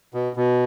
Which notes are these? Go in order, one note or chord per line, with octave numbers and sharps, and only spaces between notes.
B2
B2